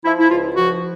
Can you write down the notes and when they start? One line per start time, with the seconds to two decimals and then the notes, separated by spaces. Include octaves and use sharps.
0.04 F3 E4
0.19 E4
0.30 C#2 F4
0.55 F3 F#4